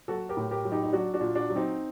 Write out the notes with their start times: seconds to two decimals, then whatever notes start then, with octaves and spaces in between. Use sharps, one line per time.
0.08 F#3 F#4 A4
0.29 G4 A#4
0.37 A2
0.51 G4 A#4
0.65 F#3
0.72 D#4 G4
0.83 D#4
0.93 F#3 D4 F#4
1.14 D4 F#4
1.21 A#2
1.35 D4 F#4
1.50 F#3
1.56 C4 D#4